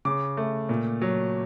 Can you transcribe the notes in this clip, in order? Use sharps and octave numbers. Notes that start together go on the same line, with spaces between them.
C#3 D6
A3
A#2
F#3